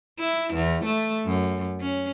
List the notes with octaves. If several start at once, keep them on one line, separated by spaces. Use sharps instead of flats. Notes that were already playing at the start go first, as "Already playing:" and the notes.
E4
E2
A3
F#2
C#4